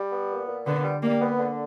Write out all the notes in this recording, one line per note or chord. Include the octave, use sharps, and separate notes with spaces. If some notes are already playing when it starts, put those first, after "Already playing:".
Already playing: G3
B3
A#2
A#2
D3 B3
G3
G3 A#3
B3
D3